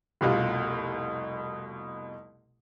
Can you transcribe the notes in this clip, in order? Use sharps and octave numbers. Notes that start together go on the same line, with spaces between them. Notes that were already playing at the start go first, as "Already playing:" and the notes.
F1 C2 B2 F4